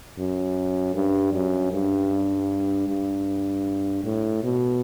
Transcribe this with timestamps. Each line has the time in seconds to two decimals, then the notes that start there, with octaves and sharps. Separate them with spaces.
0.19 F#2
0.95 G2
1.34 F#2
1.73 G2
2.88 G2
4.05 A2
4.44 B2